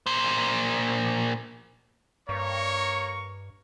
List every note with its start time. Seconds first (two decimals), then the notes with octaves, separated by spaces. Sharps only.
0.07 A#2 C5
2.29 G2 A#3 C#5 A#5 C#6